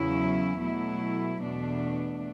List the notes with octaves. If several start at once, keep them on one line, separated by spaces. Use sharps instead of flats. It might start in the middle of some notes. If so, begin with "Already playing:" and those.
Already playing: E2 C#3 F#3 C#4 E4
B2 F#3 A3 E4
E2 B2 A3 D4